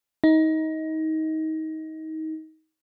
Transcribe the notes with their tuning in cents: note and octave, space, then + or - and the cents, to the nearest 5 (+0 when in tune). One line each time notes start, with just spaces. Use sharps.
D#4 +25